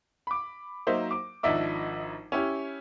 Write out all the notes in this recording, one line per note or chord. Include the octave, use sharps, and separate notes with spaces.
B5 D6
F#3 A#3 D#4 C5 E5
D6
G#1 F3 D4 D#4 E5 D6
C#4 E4 G4